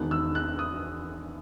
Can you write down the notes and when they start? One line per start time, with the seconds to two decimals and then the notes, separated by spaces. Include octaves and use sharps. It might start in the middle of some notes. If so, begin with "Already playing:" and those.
Already playing: E1 E2 D#3 F#6
0.11 E6
0.35 F#6
0.59 D#6